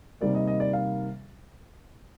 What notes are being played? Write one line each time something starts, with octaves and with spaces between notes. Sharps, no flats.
C3 D#3 G3 A#3 D5
D#5
D#5
D5
F5